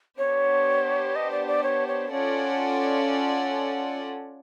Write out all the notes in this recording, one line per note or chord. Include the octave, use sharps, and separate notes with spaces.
B3 D4 G4 C5 C#5
D#5
D5
D5
C#5
C#5
C#4 F4 A4 C#5 D5 F#5